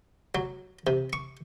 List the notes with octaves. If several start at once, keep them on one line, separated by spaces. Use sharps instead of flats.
F#3
C3
C#6